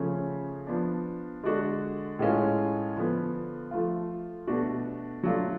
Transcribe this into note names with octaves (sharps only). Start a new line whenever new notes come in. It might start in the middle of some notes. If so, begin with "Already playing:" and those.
Already playing: C#3 F3 A3 C#4
F3 B3 D4
D3 G#3 D4 F#4
A2 G#3 C#4 F4
D3 F3 B3
F3 A3 F4
B2 A3 D4 F#4
F#3 A3 D4 F4